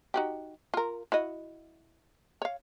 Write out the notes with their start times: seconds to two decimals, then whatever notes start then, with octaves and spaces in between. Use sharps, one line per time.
0.14 D#4 F#4 G4
0.74 F4 A#4
1.12 E4 F#4 D#5
2.42 C#5 F5